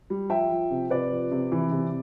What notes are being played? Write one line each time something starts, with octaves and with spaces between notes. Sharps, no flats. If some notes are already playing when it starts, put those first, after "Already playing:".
G3
F3 E5 G5
F3
C3
C3 B4 D5
F3
C3
E3
C3